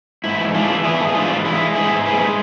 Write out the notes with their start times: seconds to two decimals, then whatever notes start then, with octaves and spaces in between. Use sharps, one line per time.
0.24 G#2 E4
0.39 E3
0.54 G#3 D4 F4
0.70 E3
0.84 E3 E4 G#4
0.99 G#2 A4
1.08 G#4
1.14 G#2 D4 F4
1.30 E3
1.45 G#3 E4
1.61 G#3
1.75 G#2 E4 G#4
1.91 G#2
2.06 G#3 G#4 B4
2.21 G#3